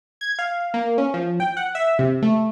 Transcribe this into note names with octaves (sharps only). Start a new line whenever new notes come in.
G#6
F5
A#3
C#4
F3
G5
F#5
E5
C3
A3